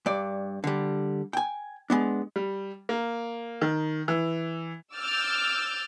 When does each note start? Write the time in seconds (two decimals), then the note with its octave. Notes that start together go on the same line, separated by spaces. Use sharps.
0.06 G2 D5
0.64 D3 G3
1.33 G5 G#5
1.90 G#3 B3 D4
2.36 G3
2.89 A#3
3.62 D#3
4.08 E3
4.95 D6 E6 F6 G6 A6